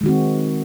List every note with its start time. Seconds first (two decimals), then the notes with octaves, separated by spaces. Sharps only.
0.01 G#3
0.03 D#3
0.06 F#4
0.08 C4